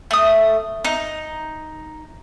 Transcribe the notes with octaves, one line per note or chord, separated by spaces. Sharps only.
A3 D#6
D#4